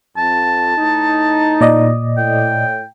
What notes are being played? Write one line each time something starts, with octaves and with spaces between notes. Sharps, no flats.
F2 A5
A2 D#4
A#2 D5 D#5
A2 G5